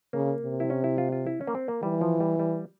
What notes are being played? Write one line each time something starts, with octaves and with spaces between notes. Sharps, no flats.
C#3 A#3
C3
E4
C#4
E4
F4
F4
E4
C#4
A#3
C4
A#3
E3 G3
F3
G3
G3